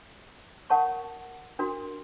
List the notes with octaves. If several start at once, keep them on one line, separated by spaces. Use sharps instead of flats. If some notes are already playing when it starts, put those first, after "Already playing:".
A#4 C#5 F#5 A5 C#6
D4 F#4 A#4